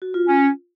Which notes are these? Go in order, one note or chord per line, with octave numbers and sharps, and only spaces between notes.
F#4
F4
C#4